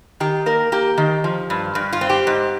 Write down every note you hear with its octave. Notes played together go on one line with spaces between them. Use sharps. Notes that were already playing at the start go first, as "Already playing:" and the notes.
D#3 G4
A#3 A#4
A#3 G4
D#3
F3
G2
G2
F4
C4
G4
G#2